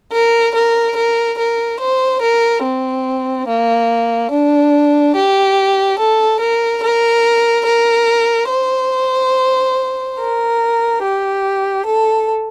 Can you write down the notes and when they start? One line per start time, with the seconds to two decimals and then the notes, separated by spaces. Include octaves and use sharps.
0.13 A#4
0.54 A#4
0.96 A#4
1.38 A#4
1.80 C5
2.22 A#4
2.63 C4
3.47 A#3
4.31 D4
5.16 G4
5.99 A4
6.40 A#4
6.83 A#4
7.66 A#4
8.49 C5
10.18 A#4
11.01 G4
11.85 A4